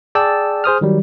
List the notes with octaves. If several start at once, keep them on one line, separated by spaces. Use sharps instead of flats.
G#4 D5 G5 A5 E6
G#4 C5 D#6 F6
D#3 F#3 G3